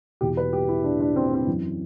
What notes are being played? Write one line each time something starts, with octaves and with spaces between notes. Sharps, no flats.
E2 B2 G4
B4
G4
E4
D4
D4
C4
D4
C4
F#2 E3